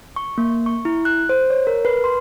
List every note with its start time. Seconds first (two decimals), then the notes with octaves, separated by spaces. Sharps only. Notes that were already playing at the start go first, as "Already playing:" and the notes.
0.16 C#6
0.38 A#3
0.66 C#6
0.85 E4
1.05 F#6
1.29 C5
1.50 C#5
1.67 A#4
1.85 B4
2.04 C6